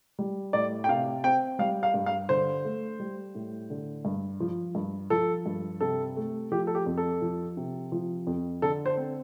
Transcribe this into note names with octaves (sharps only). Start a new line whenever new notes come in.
G3
A2 D5
G5
C3 F5
C4 G5
G3 F5
F5
G2
F5
D3 C5
A3
G3
A2
D3
G2
F3
G2
F3 A4
G2
C3 A4
A3
F3 G4
A4
G4
F2
A4
F3
C3
F3
F2
D3 A4
C5
C4